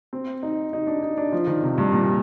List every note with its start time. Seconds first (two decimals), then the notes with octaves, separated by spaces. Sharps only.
0.13 C4
0.43 D#4
0.73 D#4
0.87 D4
1.03 D#4
1.18 D4
1.32 F3
1.47 D#3
1.63 C3
1.78 G2
1.92 A#2